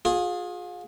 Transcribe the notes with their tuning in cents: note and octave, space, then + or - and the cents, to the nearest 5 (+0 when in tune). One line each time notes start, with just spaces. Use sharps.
F4 +35 G#4 +0